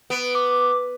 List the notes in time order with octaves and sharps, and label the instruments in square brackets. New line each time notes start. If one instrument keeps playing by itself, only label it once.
[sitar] B3 [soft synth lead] D7
[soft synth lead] D6